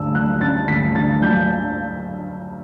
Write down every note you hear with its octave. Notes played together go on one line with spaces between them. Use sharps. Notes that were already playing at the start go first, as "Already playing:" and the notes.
Already playing: D2 D3 E6
F#3 F#6
C#4 A6
D2 B6
D3 A6
F#3 G6